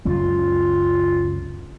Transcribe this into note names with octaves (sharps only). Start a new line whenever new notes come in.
C#2 F#2 F#3 F4